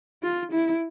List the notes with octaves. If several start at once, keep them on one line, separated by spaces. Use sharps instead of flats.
F4
E4